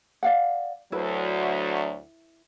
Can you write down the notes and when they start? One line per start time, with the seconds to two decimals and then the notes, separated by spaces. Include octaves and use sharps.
0.23 D5 F5 F#5
0.92 D2 F#3 E4 B4